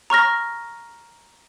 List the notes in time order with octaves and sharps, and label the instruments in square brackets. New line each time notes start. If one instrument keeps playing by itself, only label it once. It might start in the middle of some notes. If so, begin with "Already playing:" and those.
[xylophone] A#5 C#6 F6 A#6